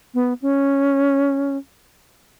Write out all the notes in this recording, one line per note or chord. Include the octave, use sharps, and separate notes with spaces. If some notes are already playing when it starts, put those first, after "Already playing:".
B3
C#4